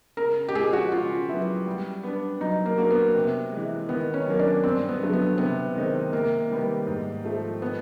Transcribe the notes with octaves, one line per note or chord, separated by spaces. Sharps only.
C#3 A#4
G4
F3 G#3 G#4
F#4
C#3 F4
F#3 B3 E4
G3
B3 D4
F#3 D#4
A#3
A#3 D4 F#4 A#4
B3
C3
E3 G#3
D#3 B3
C#4
F#3 A#3
D4
G2 C4
B3
D3 F#3 A3
B3
C3 B3
D#3 G#3 C4 D#4
C3 A#3
D#3 G3 B3
G#2
F3 A3
B3